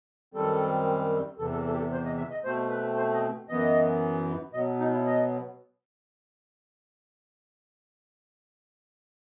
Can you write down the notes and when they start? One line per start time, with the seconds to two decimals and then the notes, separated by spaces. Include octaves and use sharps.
0.34 F#2 D#3 G3 C4 A4
1.38 E2 C3 E3 A4
1.52 A4
1.65 A4
1.73 G4
1.78 A4
1.92 C5
2.05 D#5
2.17 E5
2.31 D#5
2.44 B2 A3 C4 C5
2.70 B4
2.96 C5
3.14 D#5
3.49 F#2 E3 B3 D#5
4.54 B2 D#5
4.56 F#3 B3
4.80 D#4
4.93 E4
5.06 D#5